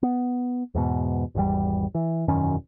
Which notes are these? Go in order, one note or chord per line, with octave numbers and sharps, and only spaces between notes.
B3
E2 G#2 B2
G#1 E2 G3
E3
E1 F#2 D#3 C#4